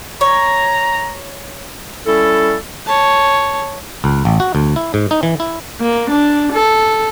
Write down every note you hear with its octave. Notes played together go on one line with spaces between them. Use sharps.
C#5 A#5
G3 C#4 E4 A4
C#5 A5
C#2
A1
F#4
D2
E4
G#2
D#4
E3
E4
A#3
D4
A4